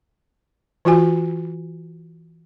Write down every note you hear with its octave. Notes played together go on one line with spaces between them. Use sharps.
E3 F4 F#4 G#5